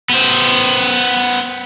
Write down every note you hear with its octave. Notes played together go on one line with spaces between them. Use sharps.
B3 C5